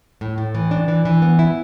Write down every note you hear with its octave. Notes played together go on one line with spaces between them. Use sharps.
A2
A2
E3
D4
E3
E3
B3
E4